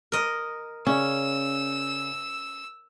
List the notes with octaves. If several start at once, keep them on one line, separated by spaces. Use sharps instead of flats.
A#4 D#5
C#3 C#4 C#5 D5 E6